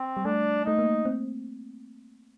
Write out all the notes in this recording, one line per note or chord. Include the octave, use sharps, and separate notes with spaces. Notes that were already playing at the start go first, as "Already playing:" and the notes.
Already playing: C4
G3
A3 D4
A3 D#4
A#3
C4